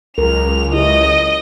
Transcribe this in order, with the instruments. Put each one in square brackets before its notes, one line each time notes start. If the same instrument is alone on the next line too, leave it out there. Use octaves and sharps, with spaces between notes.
[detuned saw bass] C#2 [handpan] F#3 A#4 [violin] F7
[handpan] E4 G4 C#5 [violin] D#5